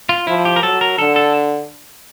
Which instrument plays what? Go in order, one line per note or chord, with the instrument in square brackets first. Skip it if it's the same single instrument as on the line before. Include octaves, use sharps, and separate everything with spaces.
[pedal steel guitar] F4
[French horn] F3 [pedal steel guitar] E4
[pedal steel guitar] G4
A#4
[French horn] F#3 [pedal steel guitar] A4
[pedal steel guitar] A#4
[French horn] D3 [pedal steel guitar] A4
[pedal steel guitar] A4